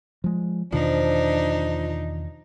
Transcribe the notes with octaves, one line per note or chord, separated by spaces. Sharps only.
F3 G#3
E2 B2 D#3 F3 D4 D#4